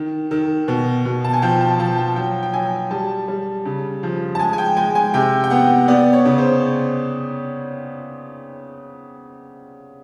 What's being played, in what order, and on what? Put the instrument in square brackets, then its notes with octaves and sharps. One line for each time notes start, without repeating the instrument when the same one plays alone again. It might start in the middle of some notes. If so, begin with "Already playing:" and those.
Already playing: [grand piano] D#3
D#3
B2
B2
A5
G#5
F3 G5
A5
F3 A5
G5
F#3 G5
G5
F#3 G#5
G3 A5
G3
C#3
F3
A5
G#3 G#5
G#5
G5
G#3 G#5
G#5
C3 G5
G5
B3 F#5
B3 D5
C#5
C#3
C5